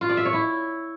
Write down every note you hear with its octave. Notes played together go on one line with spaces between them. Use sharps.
F4
D5
E5
C#5
E4